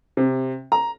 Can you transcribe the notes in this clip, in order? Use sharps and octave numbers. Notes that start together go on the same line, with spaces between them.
C3
A#5